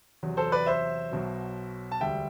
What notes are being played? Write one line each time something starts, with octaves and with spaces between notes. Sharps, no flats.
E2 C3 F#3
A4 C5
B4 D5
C5 E5
B1 B2 F#3
A5
E1 D2 D3 G3 E5 G5